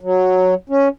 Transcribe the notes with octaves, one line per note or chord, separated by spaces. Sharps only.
F#3
C#4